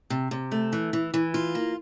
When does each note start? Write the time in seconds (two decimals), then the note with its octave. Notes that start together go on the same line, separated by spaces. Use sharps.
0.10 C3
0.31 C3
0.52 A3
0.73 E3
0.93 E3
1.14 E3
1.34 F4
1.55 A#3